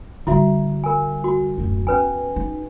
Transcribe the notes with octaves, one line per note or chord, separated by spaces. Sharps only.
D3 G3 E4 F#4 E5
A#4 G#5
F#4
D1 F#2
E2 C#4 B4 G#5
D#4